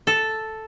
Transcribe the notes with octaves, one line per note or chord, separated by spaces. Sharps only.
A4